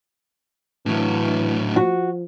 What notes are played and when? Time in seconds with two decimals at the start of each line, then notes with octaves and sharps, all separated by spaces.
0.86 A2 E3 F#3
1.76 F3 F#4